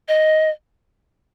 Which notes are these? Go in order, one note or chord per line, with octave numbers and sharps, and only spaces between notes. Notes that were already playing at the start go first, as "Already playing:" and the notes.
D#5